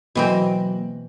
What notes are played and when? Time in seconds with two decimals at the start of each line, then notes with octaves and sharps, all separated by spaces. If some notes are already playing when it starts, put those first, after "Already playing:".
0.15 B2 E3 F#3 A#3 C4 F#4